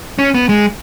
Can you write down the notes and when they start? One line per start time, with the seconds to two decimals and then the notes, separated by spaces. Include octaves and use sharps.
0.19 C#4
0.34 B3
0.49 G#3